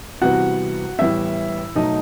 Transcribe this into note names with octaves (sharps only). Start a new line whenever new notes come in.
C3 E3 G3 B3 F#4 F#5
A2 E3 G3 B3 E4 E5
B2 F#3 A3 D#4 D#5